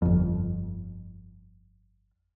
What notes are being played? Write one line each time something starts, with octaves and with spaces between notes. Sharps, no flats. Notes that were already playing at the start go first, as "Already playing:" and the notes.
G1 F2